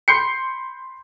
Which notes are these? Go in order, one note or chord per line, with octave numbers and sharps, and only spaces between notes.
B5 C6 G6 C7 C#7